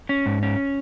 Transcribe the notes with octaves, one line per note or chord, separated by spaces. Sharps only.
C#4
G#2
C#4